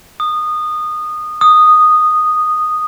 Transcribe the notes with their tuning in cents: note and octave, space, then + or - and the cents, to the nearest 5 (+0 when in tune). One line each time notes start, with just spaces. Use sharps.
D#6 -20
D#6 -10